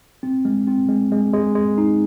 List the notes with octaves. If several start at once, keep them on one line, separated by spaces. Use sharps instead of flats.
C4
G#3
C4
G#3
G#3
G#3
G#3
D#4